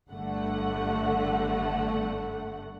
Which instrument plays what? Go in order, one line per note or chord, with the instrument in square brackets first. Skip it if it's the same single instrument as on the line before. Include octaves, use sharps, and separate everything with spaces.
[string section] G1 G2 D3 A3 F#5